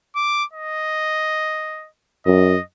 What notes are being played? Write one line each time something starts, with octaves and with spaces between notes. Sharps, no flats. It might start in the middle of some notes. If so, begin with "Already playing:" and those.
D6
D#5
F#2 D#5